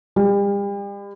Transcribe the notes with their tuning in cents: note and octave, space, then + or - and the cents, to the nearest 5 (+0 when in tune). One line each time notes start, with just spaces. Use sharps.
G3 +45